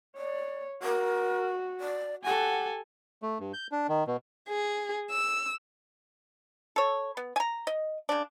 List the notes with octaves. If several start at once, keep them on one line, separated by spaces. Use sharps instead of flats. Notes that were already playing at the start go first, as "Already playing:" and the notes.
C#5 D5
F#4 A#4
D5
G4 A4 F#5 G#5
A3
G2
G6
D4
D#3
B2
G#4
E6
A4 C#5
B3
G#5 A#5
D#5
C#3 D4